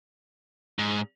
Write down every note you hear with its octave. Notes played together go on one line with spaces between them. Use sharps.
G#2